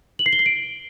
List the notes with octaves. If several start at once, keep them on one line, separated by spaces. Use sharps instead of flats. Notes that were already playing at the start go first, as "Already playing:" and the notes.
F#7
C7
G7
C7
D7